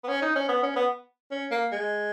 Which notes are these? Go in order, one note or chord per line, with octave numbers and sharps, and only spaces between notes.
B3
C#4
D#4
C#4
B3
C#4
B3
C#4
A#3
G#3